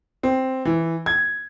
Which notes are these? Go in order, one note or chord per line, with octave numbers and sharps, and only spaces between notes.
C4
E3
G#6